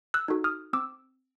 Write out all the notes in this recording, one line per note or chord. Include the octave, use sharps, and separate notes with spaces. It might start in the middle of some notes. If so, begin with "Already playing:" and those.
E6 F#6
D#4 F#4 A4
D#6 F6
C4 D6 E6